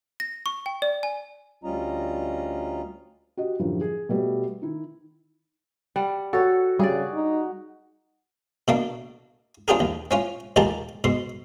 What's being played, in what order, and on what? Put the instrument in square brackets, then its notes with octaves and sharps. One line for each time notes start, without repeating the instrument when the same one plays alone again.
[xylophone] A#6
C#6
G5
D5
G#5
[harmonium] D2 G3 C#4 F4 D#5 A#5
[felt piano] F#4 G4 D#5
F#2 A2 D3 F3 G3
G#4
B2 G3 A3
D#3 E4
[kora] G3 F#5
[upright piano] F#4 [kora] A4 C#5
[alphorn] C#3 [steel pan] G3 [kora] G#4 D5
[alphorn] D#4
[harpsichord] B2 A#3 D4
C4 D4 F4 G4 G#4 A#4
D#2
C4 C#4 F4
D#2 A#2 G#3 G4 A#4 A5
G#2 B2 C6